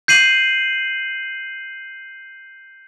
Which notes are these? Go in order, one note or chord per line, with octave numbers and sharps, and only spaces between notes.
G6 C7 D#7 F#7